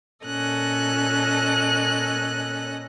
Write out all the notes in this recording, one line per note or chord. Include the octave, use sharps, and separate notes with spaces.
A#2 C#4 A4 D#5 F#6